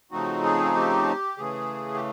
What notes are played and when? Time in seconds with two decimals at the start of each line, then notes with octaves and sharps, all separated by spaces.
0.11 C#3 F3 A3 C4 D#4 F#4
0.43 G#4
0.75 G4
1.38 C#3 E3 A3 G#4
1.94 G4